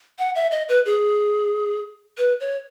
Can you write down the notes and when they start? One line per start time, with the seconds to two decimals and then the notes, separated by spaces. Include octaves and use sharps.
0.19 F#5
0.35 E5
0.51 D#5
0.69 B4
0.86 G#4
2.18 B4
2.40 C#5